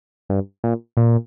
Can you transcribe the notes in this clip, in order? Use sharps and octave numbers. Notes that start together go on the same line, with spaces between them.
G2
A#2
A#2